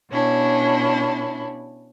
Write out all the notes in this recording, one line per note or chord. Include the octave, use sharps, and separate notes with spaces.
B2 C#4 D4 E4